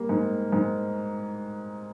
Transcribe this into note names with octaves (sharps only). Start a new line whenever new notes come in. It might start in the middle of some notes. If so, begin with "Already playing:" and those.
Already playing: G3 A#3
G#2
G#2